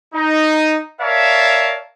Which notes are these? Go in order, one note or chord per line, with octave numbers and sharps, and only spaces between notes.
D#4
A#4 C#5 D5 E5 F5 A5